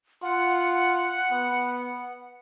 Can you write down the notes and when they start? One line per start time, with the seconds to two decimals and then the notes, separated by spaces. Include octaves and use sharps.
0.22 F4 F#5
1.31 B3